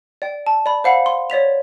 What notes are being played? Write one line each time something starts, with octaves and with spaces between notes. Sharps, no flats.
D5 G5
A5
D5 B5
C5 F5 F#5 B5
C6
C#5 D5 B6 F7